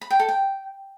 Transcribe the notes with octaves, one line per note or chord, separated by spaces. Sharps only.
B5
G5
A4
G5